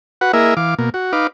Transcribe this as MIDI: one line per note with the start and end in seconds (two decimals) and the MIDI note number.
0.21 0.32 66
0.21 0.32 71
0.21 0.32 78
0.33 0.54 58
0.33 0.54 64
0.33 0.54 68
0.33 0.54 70
0.33 0.54 75
0.33 0.54 76
0.57 0.75 52
0.57 0.75 77
0.57 0.75 86
0.79 0.90 47
0.79 0.90 58
0.94 1.12 66
1.13 1.27 63
1.13 1.27 71
1.13 1.27 77
1.13 1.27 86